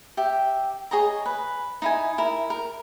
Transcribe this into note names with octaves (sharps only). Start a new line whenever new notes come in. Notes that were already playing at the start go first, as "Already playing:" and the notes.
G4 E5
G#4 C#5 D#5 A#5
B4
D#4 E4 G#5
E4 A#4
A#4